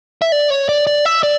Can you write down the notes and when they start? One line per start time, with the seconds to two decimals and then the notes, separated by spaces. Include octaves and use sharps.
0.22 E5
0.32 D5
0.50 C#5
0.69 D5
0.87 D5
1.05 E5
1.23 D5